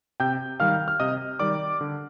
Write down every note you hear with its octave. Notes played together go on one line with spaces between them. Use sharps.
C3 G5 G6
D#3 G3 F5 F6
F6
C3 D#5 D#6
D#3 G3 D5 D6
D3